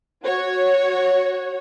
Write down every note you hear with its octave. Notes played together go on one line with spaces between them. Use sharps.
F#4 C#5